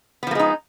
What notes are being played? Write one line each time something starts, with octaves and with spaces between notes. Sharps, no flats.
F3 G#3 A#3 B3 D#4